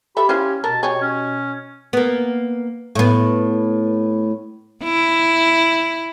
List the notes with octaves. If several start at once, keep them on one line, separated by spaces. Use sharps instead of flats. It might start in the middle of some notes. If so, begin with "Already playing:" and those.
G4 A4 E5 B5
C#4 E4 F4 C5
B2 A#4 A5
G4 G#4 C#5
C#4
A#3 B3
A2 B3
E4